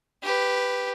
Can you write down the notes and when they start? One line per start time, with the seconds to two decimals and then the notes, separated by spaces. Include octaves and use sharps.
0.23 G4 B4